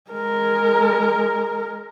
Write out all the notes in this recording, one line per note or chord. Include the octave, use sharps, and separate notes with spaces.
G#3 A#4